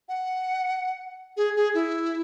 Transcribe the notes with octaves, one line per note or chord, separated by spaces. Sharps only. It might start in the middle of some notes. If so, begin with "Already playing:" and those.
F#5
G#4
G#4
E4